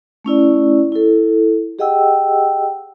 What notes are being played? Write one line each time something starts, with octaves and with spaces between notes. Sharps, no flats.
A3 C#4 E4 D5
E4 A4
G4 G#4 D#5 F#5 G5 E6